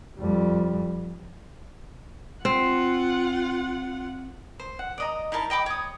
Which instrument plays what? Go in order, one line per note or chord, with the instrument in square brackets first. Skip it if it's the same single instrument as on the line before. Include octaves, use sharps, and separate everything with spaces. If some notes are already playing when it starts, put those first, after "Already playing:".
[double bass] F2 G3
[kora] C4 [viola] F4 F#5
[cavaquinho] C5
F#5
D5 D#5 A#5
D#4 E4 A#4 A5
D#5 G5 B5 D6
C#5 D#6